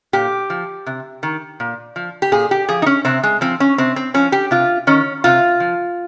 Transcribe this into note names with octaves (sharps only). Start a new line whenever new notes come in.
A#2 G4
F3
C3
D#3
A#2
F3
G4
A#2 G#4
G4
F3 G#4
D#4
C#4
C3 C4
G#3
F3 C4
C#4
C3 C4
C4
F3 C#4
G4
C3 F4
D#3 C#4
C3 F4
F3